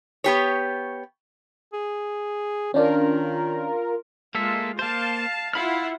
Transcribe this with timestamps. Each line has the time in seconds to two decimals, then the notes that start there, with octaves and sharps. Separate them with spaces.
0.24 B3 G4 C#5
1.73 G#4
2.74 D#3 C#4 D4 F4 A#4
4.35 G#3 A#3 F4 A4 E5
4.79 A#3 C5 F5 A5
5.53 E4 F4 F5 F#5 B5 F6